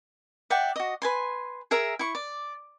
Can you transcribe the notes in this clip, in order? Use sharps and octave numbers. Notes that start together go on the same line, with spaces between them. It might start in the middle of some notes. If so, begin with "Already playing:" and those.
D5 E5 F#5 G5
F#4 D#5
B4 G#5 C6
G#4 A#4 E5 A#5
E4 C#6
D5